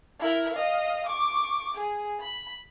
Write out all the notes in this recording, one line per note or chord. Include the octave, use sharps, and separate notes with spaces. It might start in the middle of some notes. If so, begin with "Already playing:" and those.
E4 A#4
D#5 F5
C#6 D6
G#4
B5